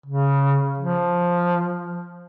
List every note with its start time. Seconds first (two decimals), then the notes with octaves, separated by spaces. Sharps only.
0.06 C#3
0.78 F3